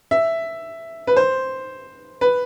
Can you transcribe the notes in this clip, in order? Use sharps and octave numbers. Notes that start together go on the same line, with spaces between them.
E5
B4
C5
B4